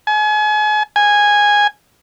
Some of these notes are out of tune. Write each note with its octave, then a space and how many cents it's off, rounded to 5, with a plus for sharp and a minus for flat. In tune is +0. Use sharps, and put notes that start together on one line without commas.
G#5 +35
G#5 -10